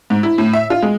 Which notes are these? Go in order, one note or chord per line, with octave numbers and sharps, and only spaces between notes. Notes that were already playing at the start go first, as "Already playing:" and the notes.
G#2
E4
A2
E5
F4
G#3